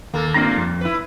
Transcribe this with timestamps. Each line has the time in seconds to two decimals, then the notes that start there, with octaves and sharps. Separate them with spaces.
0.14 D#2 A#3 A4
0.34 G2 A#2 A#3 C4 D4 A#5
0.56 F2
0.81 E4 B4